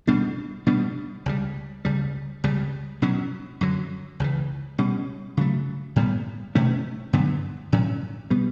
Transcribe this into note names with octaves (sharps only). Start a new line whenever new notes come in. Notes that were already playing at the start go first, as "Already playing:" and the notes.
B2 G3 B3 D4
B2 G3 B3 D4
C#2 C#3 G3
C#2 C#3 G3
C#2 C#3 G3
B2 F#3 C#4
F#2 D3 F#3
C#2 C#3 E3
B2 G3 C#4
C#3 F#3 A3
A2 G3 B3
B2 A3 C#4
G2 D3 F#3 B3
A2 F#3 C#4
B2 G3 B3